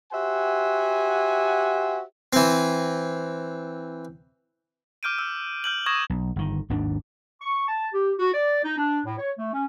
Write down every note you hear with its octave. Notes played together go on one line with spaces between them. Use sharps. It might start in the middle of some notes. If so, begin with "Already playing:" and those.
F#4 G4 C5 E5 F#5 G#5
E3 C4
D6 F6 G6 D7 D#7
E6
F6 G6 F#7
C#6 D#6 G#6 A#6 E7 F#7
B1
G1 D#3
G#1 D#2 G#2 D4
C#6
A5
G4
F#4
D5
D#4
D4
A2
C#5
A3
C#4